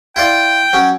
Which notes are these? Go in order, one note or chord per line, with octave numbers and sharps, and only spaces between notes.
E4 F4 D5 G5
F#3 C#4